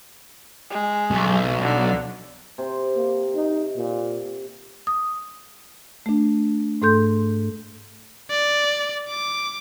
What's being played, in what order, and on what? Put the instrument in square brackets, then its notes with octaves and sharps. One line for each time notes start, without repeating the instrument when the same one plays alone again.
[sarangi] G#3
[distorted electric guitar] B1
[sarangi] D3
[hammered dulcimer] C3
[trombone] A#3
D#4
A#2
[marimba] D#6
A3 D4
G#2 A3 A4 C6 G6
[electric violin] D5
D6